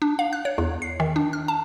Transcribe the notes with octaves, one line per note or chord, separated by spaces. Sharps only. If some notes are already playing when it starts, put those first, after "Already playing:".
D4
F5
F#6
C#5
E2
C7
D#3
D4
F6
A5